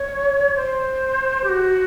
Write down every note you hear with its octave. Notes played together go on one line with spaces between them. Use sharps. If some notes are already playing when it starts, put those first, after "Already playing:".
Already playing: C#5
C5
G4
F#4